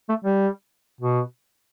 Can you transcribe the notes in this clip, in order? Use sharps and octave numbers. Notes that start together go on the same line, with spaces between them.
A3
G3
B2